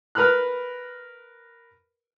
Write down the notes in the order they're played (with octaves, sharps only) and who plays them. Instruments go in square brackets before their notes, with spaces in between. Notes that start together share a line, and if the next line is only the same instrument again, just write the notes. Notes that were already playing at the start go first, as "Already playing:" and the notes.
[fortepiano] A#4 B4 B5 F6 F#6